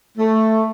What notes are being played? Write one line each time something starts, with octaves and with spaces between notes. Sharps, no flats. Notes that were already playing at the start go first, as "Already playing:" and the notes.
A3